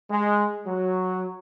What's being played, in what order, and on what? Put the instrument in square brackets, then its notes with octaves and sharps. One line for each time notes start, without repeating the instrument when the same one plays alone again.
[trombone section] G#3
F#3